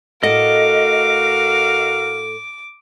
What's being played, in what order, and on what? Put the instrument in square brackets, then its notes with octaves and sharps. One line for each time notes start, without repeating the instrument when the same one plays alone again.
[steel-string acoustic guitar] A2 A4 F#5 [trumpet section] F#4 A#4 F5 [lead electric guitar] D#5 [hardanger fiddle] D6